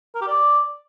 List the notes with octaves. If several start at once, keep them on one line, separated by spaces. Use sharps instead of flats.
A#4
G4
D5